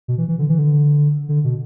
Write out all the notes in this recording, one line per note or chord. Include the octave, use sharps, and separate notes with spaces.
B2
E3
E3
D3
E3
D3
D3
B2